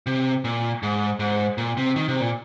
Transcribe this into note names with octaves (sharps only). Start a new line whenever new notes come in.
C3
A#2
G#2
G#2
A#2
C3
D#3
C3
A#2